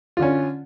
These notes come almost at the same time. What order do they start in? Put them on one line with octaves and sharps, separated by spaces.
F4 D3 C#4